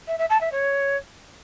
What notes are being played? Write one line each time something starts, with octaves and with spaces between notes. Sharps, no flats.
E5
E5
A5
E5
C#5